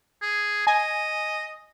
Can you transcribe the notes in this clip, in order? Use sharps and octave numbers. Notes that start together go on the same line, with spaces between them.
G#4
D#5 G#5